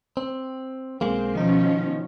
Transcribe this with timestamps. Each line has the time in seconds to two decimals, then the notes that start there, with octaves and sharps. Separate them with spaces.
0.17 C4
1.01 B1 G#3 A#3 C4
1.35 B2 D#3 F3 C#4 D#4